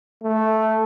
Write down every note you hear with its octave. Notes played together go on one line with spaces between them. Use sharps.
A3